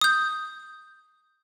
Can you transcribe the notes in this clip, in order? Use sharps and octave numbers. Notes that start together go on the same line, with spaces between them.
D#6 G6